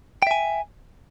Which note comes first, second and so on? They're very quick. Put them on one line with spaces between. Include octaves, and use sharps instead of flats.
G5 E5 G#5